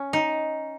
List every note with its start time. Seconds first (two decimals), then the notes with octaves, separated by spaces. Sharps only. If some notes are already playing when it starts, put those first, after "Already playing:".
Already playing: C#4
0.13 D#4